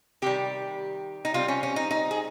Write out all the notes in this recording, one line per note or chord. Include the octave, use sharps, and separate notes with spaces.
C3 D#3 G3 G4
D#4
C3 G3 C4 F4
C#4
C#4
D#4
D#4
G#4